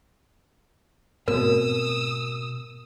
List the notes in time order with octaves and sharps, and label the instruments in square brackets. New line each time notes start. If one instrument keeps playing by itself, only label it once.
[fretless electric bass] G#2 A3 C4 [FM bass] B2 [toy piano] A#4 [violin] D#6 E6